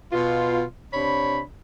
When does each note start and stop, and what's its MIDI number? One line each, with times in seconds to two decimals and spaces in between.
0.13 0.64 47
0.13 0.64 65
0.93 1.40 48
0.93 1.40 62
0.93 1.40 73
0.93 1.40 83